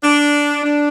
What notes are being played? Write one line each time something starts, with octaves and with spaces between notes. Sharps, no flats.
D4
D4